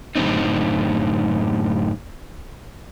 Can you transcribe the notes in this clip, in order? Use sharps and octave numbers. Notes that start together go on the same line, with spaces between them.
F#2 A2 D3 C4 D#4